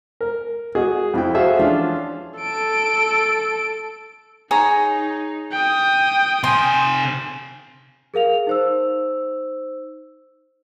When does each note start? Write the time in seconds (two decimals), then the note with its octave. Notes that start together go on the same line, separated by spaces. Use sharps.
0.21 A#4
0.75 F#4 G#4 D#5
1.14 F2 E4 G5
1.35 F#4 G#4 A4 C5 E5 F5
1.59 E3 F3 C#4 D4 F4
2.39 A4 D7
4.51 D#4 G#4 C#5 A#5
5.52 G5 D#6
6.44 C3 G#5 C6
8.14 G#4 A#4 F5 F7
8.47 D#4 C5 E6